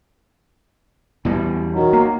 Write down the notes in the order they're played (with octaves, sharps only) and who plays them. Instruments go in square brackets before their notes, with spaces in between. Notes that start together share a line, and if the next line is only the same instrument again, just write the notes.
[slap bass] E2 B2 G3
[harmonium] D#3 F#3
[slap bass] A#3